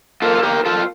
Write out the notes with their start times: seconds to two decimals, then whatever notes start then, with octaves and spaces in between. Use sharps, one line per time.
0.22 A#3 F4 A4
0.38 A4
0.43 G4 A#4
0.65 F4 A4